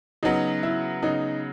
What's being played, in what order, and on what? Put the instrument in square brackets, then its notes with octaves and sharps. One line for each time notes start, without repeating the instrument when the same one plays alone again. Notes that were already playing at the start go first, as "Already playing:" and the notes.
[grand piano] C#3 F#3 B3 [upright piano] D#4
[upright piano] E4
[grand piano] C#3 F#3 B3 [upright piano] D#4